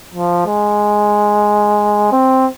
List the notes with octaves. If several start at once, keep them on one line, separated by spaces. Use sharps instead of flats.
F3
G#3
C4